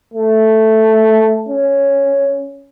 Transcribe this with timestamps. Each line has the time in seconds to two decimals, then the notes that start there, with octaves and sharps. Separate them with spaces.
0.14 A3
1.49 C#4